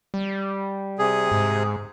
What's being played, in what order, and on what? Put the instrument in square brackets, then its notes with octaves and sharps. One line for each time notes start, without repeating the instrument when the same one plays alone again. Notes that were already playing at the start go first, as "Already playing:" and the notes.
[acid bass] G3
[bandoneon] C3 G#4
[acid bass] G#2